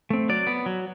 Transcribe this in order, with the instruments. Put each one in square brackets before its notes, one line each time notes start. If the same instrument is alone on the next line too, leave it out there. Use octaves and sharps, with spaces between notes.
[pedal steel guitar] A3 C4
F#3 D5
B3
F#3